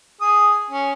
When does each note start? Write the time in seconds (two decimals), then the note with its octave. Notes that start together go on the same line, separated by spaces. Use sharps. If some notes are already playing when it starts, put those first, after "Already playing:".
0.21 G#4 D#6
0.71 C#4